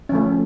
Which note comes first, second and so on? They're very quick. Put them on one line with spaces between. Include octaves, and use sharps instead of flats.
C#4 F3 A3